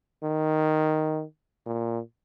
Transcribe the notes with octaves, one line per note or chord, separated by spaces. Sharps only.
D#3
A#2